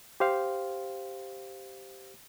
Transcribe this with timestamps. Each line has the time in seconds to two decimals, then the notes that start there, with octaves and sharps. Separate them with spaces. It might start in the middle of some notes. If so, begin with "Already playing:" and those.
0.20 G4 C5 F5